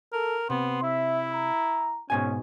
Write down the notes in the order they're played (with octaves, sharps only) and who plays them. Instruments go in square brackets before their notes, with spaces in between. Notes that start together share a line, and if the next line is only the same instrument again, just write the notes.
[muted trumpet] A4 [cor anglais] A#4
[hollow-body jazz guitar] C3 [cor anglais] B3 [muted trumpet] C6
[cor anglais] E4 [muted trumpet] E5
[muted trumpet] A#5
[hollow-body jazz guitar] G#2 B2 G#5 [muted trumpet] C#4